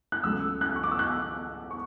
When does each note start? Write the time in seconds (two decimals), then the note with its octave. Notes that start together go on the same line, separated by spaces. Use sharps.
0.12 F#6
0.24 C#2 C#3 F#3 A3 E6
0.61 F#6
0.76 C#6
0.83 D6
0.91 E6
0.99 F#6
1.71 C#6